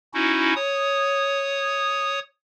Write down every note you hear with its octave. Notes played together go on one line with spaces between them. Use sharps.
C#4 D#4 E4 F#4
C#5 D#6